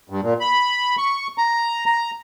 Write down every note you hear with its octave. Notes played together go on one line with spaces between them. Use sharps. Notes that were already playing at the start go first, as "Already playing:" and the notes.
G2
A#2
B5
C#6
A#5
A#5